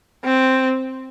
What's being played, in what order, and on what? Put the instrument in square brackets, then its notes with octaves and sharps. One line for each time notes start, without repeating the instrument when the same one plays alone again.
[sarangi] C4